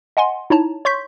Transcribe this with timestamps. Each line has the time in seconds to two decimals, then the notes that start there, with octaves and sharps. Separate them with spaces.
0.17 D#5 F#5 G#5 C6
0.50 D#4 E4 C#5 A5 A#5
0.85 C#5 C6 C#6 G6 B6